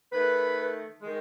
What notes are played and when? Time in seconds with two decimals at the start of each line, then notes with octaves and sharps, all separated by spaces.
0.12 D#3 A3 B4
1.01 D#3 G#3